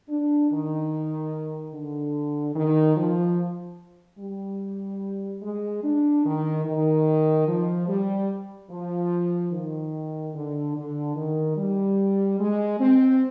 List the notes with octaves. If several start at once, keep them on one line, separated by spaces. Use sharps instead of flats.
D4
D#3
D3
D#3
F3
G3
G#3
D4
D#3
D#3
F3
G3
F3
D#3
D3
D3
D#3
G3
G#3
C4